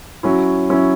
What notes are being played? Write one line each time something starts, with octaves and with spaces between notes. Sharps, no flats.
F#3 C#4 E4
F#3 C#4 E4